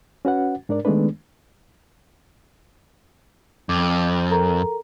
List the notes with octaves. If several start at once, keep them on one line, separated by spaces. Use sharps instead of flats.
C#4 F#4 B4 F#5
G#2 D4 A#4 D5
D#3 G#3 A3 B3 D4 B4
F2 D6
A4 A#4 A#5